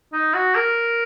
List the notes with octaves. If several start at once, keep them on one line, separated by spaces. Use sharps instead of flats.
D#4
F#4
A#4